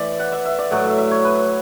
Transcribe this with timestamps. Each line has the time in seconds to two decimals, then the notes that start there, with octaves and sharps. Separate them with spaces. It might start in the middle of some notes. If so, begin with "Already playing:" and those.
Already playing: A2 E3 D5 E5
0.19 F#5
0.32 E5
0.45 E5
0.59 D5
0.71 A2 F#3 F#5
0.84 E5
0.98 E5
1.11 C#5
1.24 B4